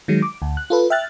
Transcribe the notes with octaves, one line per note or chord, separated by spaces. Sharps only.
D#3 F#3 G#3
D6
D2
F#6
F4 A4 B4
E5 G5 F6 F#6 A6